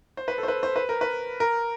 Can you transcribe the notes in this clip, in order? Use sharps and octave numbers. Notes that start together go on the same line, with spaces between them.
C5
B4
A4
C5
B4
C5
B4
A#4
B4
A#4